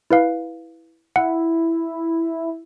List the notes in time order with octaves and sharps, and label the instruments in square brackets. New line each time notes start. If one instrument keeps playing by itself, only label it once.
[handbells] E4 B4 F5
[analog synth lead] E4 [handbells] F#5